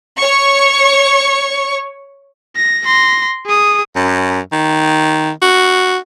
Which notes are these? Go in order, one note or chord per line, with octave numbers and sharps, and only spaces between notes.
C#5 C#6
A#6
C6 A#6
G#4 D#6
F#2
D#3
F#4